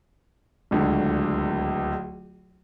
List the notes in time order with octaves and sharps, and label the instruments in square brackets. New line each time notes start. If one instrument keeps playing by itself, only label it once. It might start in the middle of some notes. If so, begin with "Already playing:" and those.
[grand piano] D1 C#2 D3